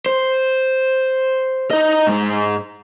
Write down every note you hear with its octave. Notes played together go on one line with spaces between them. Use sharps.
C5
D#4 D#5
G#2 G#3